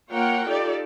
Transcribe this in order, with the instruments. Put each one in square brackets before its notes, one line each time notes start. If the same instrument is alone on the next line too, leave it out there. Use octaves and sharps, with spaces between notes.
[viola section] A#3 F4 A#4 C#5 F#5 G5
D#4 F4 G4 A4 D5